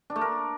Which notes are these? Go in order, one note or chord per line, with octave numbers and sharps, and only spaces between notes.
D4
A3
A#4